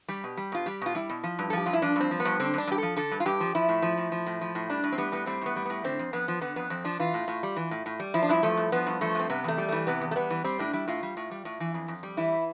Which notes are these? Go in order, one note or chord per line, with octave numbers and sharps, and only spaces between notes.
G3 G4
B2
G3
B2 F4
G3 G4
B2 F4
G3 E4
B2
F3
G2
A4
F3 G4
G2 F4
E4
F3 D4
G2 C4
F3
B3
G2
D3 C4
G2 D4
G2 G4
F3 A4
D3 A4
G2
F4
G2 G4
F3
F3 E4
A2
F3
A2
F3
A2
F3
A2
G3 D4
A2
C4
G3 B3
A2 B3
G3 C4
A2 B3
G3
A2 B3
D3 C4
F2
F2 B3
F3
D3 B3
F2 B3
F2 C4
F3 D4
E3 F4
A2
A2
G3
E3
A2
A2
G3
F3 E4
D4
G2 E4
F3 A3
G2
F3 B3
G2
F3 A3
G2 C4
C3 B3
E2 A3
G3
E3 A3
C3 B3
E2
A3
G3 B3
E3
G3 C4
A2 D4
G3 E4
A2 F4
G3
A2
G3
A2
E3
F2
F2
G3
E3 E4